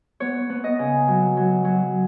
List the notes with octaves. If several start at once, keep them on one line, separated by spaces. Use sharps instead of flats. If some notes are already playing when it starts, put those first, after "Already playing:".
B3 C#5
B3
D#5
C#3
F#3
F#3
F#3